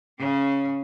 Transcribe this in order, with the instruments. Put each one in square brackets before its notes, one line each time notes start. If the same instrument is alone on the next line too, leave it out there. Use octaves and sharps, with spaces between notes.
[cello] C#3 C#4